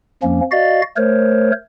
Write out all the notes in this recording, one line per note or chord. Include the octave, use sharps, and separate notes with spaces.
F2 F3 A#3 C#4
F#4 D5 D#5 F5 A6
A3 A#4 C5 C#5